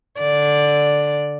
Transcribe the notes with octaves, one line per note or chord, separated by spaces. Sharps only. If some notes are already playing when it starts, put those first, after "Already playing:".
D3 D5